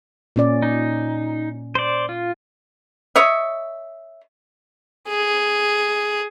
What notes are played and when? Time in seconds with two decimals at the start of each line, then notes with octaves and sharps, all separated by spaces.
0.36 A#2 C#4 D5
0.62 D#4
1.75 C5 D5
2.09 F4
3.16 C#5 D#5 E5
5.08 G#4